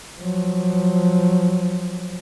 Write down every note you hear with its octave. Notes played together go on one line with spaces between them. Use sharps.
F3 F#3